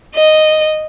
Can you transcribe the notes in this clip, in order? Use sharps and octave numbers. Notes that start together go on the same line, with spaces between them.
D#5